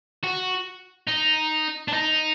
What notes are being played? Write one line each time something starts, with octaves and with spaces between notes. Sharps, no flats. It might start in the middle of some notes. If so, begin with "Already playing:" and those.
F#4
D#4
D4
D#4